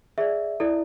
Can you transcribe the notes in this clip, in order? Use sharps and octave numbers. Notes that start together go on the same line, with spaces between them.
G#4 D5 E5
E4 A4 D5